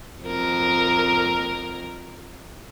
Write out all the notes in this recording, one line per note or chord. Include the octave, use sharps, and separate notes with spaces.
F2 A#4